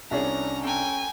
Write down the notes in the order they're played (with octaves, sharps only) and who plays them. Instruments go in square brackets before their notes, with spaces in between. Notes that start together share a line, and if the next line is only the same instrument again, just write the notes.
[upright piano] C2 D4 C#5 [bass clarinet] C#4 [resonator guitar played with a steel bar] G#4 D5 E5 [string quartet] A#5
[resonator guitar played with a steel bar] C4 A4 A#5 [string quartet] G5 G#5